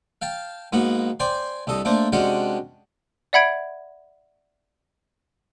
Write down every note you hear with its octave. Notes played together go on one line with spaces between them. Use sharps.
F5 G5 A5
G#2 A#3 B3 F#4
C5 D5 G5 G#5 C6
C2 G2 A4 D#5
A3 A#3 D4 C5
C3 G#3 C#4 D4 F#4 G4
D5 E5 F#5 B5 G#6 D7